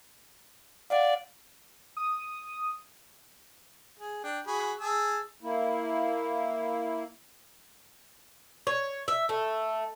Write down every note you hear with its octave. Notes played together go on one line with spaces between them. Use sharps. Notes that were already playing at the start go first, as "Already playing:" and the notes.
D5 F5 F#5
D#6
G#4
D4 G5
F#4 G#4 B5
G#4 A5 E6
A#3 E4
C#5
E5
A3